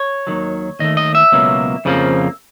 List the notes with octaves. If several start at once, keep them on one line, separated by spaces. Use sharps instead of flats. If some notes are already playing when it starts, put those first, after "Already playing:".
Already playing: C#5
D#2 D#3 F#3
D#2 D#3 A3 D#5
D#5
E5
C#2 B2 F#3 A#3
F2 C#3 F3 A#3